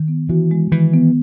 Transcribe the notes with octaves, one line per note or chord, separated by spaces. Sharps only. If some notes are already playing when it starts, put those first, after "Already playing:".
Already playing: D#3
B3
E3 F#4
G#3
D#3 E3
B3